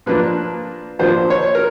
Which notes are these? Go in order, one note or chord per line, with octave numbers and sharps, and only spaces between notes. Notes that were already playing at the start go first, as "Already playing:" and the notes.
A#2 F3 A#3 D4 B4
A#2 F3 A#3 D4 C5
C#5
A#4